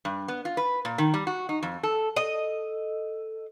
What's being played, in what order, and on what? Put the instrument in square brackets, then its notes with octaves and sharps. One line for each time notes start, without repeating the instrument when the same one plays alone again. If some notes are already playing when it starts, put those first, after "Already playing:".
[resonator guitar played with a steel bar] G2
B3
F4
B4
A#2
D#3
G3
F#4
D#4
F2
A4
[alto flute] A4 [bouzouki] D#5